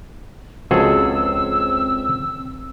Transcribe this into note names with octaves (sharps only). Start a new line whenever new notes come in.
C#2 F3 C4 F4 F#4 G#4 A4 E6